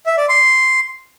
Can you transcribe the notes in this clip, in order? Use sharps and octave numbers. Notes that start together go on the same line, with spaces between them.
E5
D5
C6